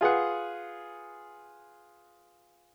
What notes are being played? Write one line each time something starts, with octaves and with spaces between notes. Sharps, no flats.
F4 G#4 B4 F#5